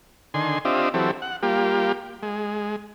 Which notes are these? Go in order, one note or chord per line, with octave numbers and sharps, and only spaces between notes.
D3 D#3 G#5 C6
C4 D4 F4 G4 D#5 E5
E3 F#3 C4 G4 A4
F#5
G3 A#3 F4 G4
G#3